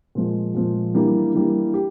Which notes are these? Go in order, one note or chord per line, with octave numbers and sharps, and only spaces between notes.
A#2 F3 G#3
A#2 F3 G#3
E3 G3 A#3 D4 G4
E3 G3 A#3 D4 G4
G4